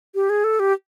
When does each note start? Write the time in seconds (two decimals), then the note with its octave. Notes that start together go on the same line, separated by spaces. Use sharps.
0.15 G4
0.30 G#4
0.44 A4
0.60 G4